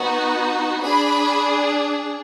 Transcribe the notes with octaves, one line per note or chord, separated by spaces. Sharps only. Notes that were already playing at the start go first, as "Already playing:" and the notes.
Already playing: B3 D#4 F#4
D4 G#4 B5